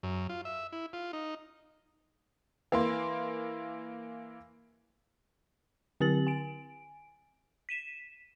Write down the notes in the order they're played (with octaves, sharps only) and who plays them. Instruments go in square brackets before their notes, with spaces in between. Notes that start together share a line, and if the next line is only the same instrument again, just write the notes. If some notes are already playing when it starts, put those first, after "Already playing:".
[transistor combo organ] F#2
F4
E5
E4
F4
D#4
[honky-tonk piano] E3 A#3 C6
[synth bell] D3 C4 G4 A6 F#7
G#5 D7
B6 D#7 E7